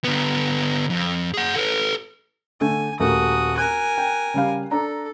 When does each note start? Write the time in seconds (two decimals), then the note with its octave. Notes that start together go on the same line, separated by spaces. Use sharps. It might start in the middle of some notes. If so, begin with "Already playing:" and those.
0.04 D3 B3
0.90 F2
1.34 G#4 F#5
1.56 A4 B4
2.61 D3 A3 G#5
3.00 D#1 A3 F#4 A#4 D#6
3.58 A#4 G#5 F#6
3.98 G5
4.34 C#3 G3 F5
4.71 D4 A4 A#5